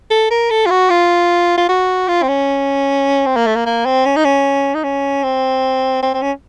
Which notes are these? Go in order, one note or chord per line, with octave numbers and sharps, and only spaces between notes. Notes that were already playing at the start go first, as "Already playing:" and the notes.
A4
A#4
A4
F4
F#4
F4
F4
F#4
F4
C4
C#4
C4
A#3
A3
A#3
A#3
C4
C#4
D#4
C#4
D#4
C#4
C4
C4
C4
C#4